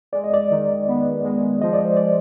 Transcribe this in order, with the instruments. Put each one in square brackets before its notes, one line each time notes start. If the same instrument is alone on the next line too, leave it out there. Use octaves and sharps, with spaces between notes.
[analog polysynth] G#3 [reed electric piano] D5
[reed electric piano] D#5
D5
[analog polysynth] D#3
B3
G#3
[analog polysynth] F3 [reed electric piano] D#5
[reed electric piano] D5
C5
D5